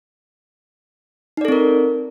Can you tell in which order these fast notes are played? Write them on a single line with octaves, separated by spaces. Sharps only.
D#4 D5 A4 C4 A#4